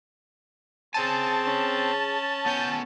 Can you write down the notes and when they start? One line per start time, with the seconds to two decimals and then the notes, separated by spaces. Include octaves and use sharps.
0.94 C4 G#4 C#5 G#5 A5
1.44 C#4
2.46 B3 C#5 G#5 G6